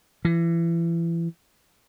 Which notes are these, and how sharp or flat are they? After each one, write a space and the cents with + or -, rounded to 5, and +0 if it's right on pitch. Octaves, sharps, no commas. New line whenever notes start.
E3 +30